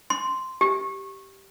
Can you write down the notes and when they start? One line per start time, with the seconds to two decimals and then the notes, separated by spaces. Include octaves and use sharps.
0.10 C6
0.61 G4